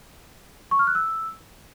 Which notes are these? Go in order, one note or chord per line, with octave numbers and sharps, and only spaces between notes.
C#6
F6
F#6
E6